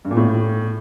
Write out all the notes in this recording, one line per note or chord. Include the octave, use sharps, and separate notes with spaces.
G2
A#2
A2